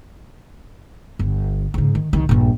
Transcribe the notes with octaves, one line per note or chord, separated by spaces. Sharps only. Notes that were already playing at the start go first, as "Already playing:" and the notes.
G1
G#2 C#3
D#3
C2 D#3
A#1 G2